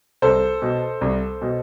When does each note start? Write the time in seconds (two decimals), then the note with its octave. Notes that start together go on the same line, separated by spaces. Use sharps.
0.22 C2 A4 C5
0.62 B2
1.01 C2
1.42 B2